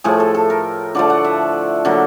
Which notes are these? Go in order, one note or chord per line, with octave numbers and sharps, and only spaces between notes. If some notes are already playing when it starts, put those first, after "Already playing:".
A2 F3 A3 G#4
A4
A4
A#4
D3 F3 A3 D5
F#5
E5
D3 F#3 A#3